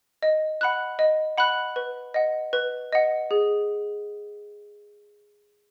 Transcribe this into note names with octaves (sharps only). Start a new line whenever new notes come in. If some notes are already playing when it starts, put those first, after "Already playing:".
D#5
F#5 B5 F#6
D#5
F#5 B5 F#6
B4
D#5 F#5
B4
D#5 F#5
G#4